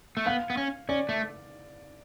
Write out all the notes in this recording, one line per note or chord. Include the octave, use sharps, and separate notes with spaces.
A3
B3 F5
B3
C#4
C#4 D5
A3